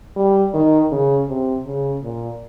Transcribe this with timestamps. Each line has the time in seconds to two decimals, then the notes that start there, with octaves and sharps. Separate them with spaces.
0.16 G3
0.54 D#3
0.91 C#3
1.29 C3
1.66 C#3
2.03 A#2